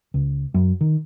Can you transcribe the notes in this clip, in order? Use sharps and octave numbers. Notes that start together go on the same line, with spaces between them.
C#2
F#2
D#3